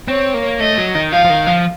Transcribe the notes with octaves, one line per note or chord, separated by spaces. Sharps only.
C4 C#5
A#3
A3 D#5
F#3
D#3
F3 F5
F3
D#3
F3